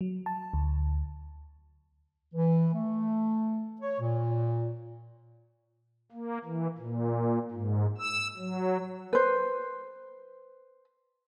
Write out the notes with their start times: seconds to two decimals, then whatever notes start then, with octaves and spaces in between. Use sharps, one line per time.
0.01 F#3
0.26 A5
0.54 D2
2.34 E3
2.74 A3
3.82 C#5
4.00 A#2
6.12 A#3
6.45 E3
6.78 A#2
7.51 G#2
7.98 E6
8.37 F#3
9.13 B4 C5